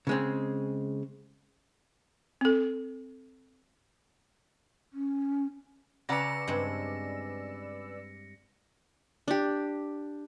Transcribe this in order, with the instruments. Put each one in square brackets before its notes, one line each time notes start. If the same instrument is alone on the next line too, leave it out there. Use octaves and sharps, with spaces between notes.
[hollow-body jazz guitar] C#3 G#3 C4
[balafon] C4 A4
[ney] C#4
[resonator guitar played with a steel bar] C#3 F#5 A#5 [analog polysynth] B4 D5 E6 [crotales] A#6 C#7
[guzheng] G2 G#3 C4
[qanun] D4 G4